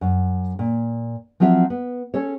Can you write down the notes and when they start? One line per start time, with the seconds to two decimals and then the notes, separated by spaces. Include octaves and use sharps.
0.01 F#2
0.59 A#2
1.40 F3 F#3 C4 F4 E5
1.70 B3
2.14 C#4 A4 C#5